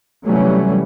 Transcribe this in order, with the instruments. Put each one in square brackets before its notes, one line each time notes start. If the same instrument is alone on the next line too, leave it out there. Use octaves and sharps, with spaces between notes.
[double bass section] C3 E3 F#3 G3 A3 C#4